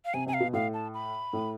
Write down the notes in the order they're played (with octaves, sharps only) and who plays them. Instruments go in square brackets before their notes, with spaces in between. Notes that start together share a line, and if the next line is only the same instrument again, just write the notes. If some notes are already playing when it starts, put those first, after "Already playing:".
[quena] F5
[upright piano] C3 [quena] G#5
[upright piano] C3 [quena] G#5
[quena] F5
[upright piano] B2
[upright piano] A2 [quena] F5
[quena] A5
B5
[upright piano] A2